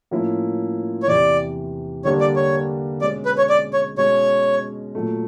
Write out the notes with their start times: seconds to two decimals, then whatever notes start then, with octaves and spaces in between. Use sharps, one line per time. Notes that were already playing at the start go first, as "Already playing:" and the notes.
0.11 A2 F3 A#3 C#4 E4
1.03 C#5
1.07 E2 C3 E3 D5
2.05 D3 G3 A#3 D4 C#5
2.21 D5
2.36 C#5
3.01 B2 G#3 C#4 D5
3.25 B4
3.38 C#5
3.49 D5
3.73 C#5
3.97 B2 G#3 C#4 F#4 C#5
4.95 A#2 F#3 A3